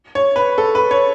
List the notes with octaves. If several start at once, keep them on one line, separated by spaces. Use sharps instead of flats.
C#5
B4
A4
B4
C#5